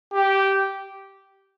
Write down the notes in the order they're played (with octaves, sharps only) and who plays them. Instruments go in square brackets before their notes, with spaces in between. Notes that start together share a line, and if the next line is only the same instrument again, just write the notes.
[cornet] G4